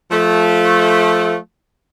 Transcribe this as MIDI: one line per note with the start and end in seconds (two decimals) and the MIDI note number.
0.11 1.35 53
0.11 1.35 57